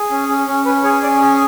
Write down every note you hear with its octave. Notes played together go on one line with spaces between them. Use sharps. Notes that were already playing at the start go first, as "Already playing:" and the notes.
Already playing: G#4
C#4
C#4
C#4
C#4 B4
G#4 C#5
C#4 D5
G#4